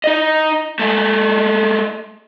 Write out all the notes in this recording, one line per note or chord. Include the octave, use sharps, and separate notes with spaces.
D#4 D#5
G#3 A3